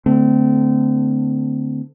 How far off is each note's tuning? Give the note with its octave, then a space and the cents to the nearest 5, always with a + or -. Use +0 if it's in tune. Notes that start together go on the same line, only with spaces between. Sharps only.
D3 +0 A3 +10 C4 -30